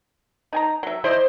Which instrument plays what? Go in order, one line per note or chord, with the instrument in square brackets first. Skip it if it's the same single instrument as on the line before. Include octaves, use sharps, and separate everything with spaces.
[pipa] D#4 G#5 A#5
F#3 E5
[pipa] E4 D5 D#5 [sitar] C5